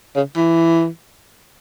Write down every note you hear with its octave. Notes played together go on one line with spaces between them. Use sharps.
C#3
E3